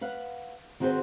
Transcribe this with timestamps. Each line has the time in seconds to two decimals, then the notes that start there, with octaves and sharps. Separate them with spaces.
0.01 B4 F5 F#5
0.80 D#3 C4 F#4 G#4 B4 C5